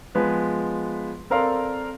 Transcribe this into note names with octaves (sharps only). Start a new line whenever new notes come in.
F3 G#3 B3 B4
C4 A4 A#4 D5 F5 C6